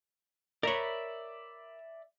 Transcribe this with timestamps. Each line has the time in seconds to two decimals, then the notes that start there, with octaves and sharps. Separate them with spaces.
0.63 A#4 C#5 D5 E5 B5